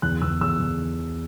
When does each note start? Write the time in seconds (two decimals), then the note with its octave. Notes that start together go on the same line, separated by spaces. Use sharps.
0.02 E2 F#6
0.22 E2 E6
0.41 E2 E6
0.60 E2